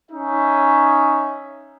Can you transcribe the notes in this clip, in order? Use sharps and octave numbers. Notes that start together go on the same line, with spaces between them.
C#4 D#4 E5